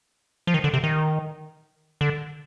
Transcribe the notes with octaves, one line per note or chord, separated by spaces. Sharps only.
F3
D#3
D3
C3
D#3
D3